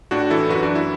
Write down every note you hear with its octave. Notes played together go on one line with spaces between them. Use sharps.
A2 D4 F#4
E3 E4 A4
F#2 F#4 B4
D4 F#4
F#2
E4